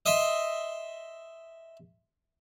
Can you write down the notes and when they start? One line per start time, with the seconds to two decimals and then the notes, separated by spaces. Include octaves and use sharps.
0.06 D#5 E5 C6